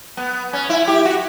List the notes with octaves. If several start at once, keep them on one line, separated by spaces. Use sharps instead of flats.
B3
C#4
E4
G4
F#4